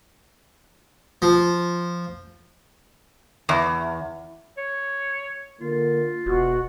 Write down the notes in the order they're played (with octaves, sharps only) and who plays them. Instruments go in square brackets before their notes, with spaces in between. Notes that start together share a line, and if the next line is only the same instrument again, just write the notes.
[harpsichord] F3
[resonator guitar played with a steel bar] E2
[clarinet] C#5
[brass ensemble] D3 A#3 [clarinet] F4
[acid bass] E1 [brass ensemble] B2 [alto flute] F#4